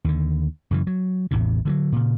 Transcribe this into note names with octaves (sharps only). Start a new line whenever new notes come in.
D#2 D3
F#2 C#3 E3
F#3
A1 E2 A2 C3
D3 F3 F#3
A#2 C#3